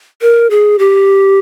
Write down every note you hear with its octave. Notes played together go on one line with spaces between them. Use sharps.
A#4
G#4
G4